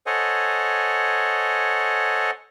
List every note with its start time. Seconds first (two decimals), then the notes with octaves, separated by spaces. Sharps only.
0.06 A4 C5 C#5 D#5 F#5 G#5